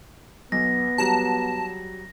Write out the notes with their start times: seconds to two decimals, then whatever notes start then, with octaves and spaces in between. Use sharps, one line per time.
0.52 B1 B3 A#6
0.98 F#3 G3 A5 A#5